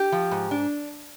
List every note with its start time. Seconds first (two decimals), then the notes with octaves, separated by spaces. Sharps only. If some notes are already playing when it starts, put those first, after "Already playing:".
Already playing: G4
0.12 F3
0.31 G#2
0.51 D4